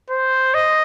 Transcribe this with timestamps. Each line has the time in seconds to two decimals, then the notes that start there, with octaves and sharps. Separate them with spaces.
0.10 C5
0.54 D#5